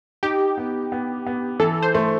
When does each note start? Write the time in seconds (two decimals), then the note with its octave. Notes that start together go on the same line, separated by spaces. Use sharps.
0.23 D#4 G4
0.58 B3
0.92 B3
1.27 B3
1.60 E3 A4
1.82 C5
1.95 A3